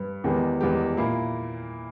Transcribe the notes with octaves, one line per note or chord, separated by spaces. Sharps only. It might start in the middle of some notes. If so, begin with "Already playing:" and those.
Already playing: G2 G3 B4
E2 D#3 G#3 B3 G4
E2 D#3 G#3 B3 G4
A#2 A#3 E4